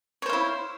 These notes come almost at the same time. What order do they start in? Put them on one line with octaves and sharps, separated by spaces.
C#5 C5 F5 E4